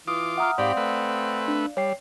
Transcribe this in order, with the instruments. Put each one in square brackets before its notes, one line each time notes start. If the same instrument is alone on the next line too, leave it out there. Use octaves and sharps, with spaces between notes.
[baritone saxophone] E3 [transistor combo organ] F4 D6 [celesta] D#6
[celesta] E5 A#5 F6 [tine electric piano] F#5 D#6
[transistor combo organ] G#2 G4 B5 [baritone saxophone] C4 [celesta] D5 F5
[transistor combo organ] A3 B4
[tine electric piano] D4
[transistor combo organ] G3 [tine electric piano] C#5 G5 C7